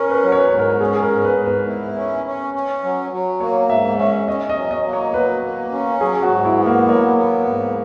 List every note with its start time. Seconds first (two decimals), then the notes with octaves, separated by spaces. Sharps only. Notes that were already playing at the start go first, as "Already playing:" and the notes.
Already playing: C#4 A#4
0.09 B4
0.15 A#4
0.23 F#3
0.32 C#5
0.38 B4
0.52 G#2
0.59 A#4
0.80 C#4 G#4
0.93 G#4
1.02 A#4
1.09 G#2
1.25 B4
1.38 G#2
1.46 B4
1.67 E4
1.96 C#4
2.26 C#4
2.54 C#4
2.83 F#3
3.12 F#3
3.41 A#3 C#5
3.70 G#2 E5
3.98 C#4 E5
4.28 C#4 D#5
4.49 D#5
4.56 F#3
4.71 D#5
4.86 A#3
4.93 C#5
5.14 F#3 B4
5.44 A#3
5.72 C#4
6.01 F#3 G#4
6.23 F#4
6.30 G#2
6.44 E4
6.58 B3
6.66 A#3
6.87 F#3 A#3
7.17 B3
7.45 G#2